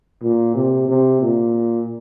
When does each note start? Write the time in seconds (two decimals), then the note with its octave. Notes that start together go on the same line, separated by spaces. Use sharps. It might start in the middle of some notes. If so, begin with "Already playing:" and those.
0.22 A#2
0.55 C3
0.89 C3
1.22 A#2